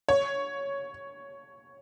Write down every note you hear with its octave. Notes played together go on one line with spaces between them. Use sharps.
C#5